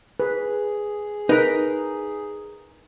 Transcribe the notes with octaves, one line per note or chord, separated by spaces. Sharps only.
G#4 B4
D#4 A#4 B4